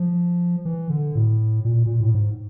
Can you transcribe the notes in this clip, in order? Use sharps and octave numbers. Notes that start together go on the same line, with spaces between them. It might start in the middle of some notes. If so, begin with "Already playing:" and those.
Already playing: F3
E3
D3
A2
A#2
A#2
A2
G#2